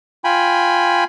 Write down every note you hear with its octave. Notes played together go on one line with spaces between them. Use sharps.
F4 G5 G#5 B5